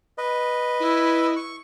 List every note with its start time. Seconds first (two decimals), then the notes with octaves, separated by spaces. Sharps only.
0.18 B4 D#5
0.80 E4
1.36 C#6